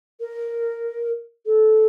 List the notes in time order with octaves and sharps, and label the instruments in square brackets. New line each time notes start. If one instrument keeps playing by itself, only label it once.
[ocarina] A#4
A4